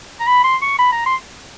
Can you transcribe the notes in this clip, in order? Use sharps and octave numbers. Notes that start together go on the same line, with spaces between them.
A#5
B5
C6
C#6
B5
A#5
C6